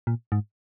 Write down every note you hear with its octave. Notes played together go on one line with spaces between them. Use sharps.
A#2
G#2